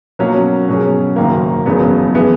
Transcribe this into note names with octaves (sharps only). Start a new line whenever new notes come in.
B2 F#3 A#3 C#4
B2 F#3 C#4 G#4
F#1 F#2 D#3 A#3
E1 E2 C#3 F#3 B3
E3 B3 E4 G#4